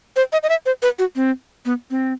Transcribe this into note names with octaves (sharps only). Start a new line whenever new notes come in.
C5
D#5
D#5
E5
C5
B4
F#4
C4
B3
C4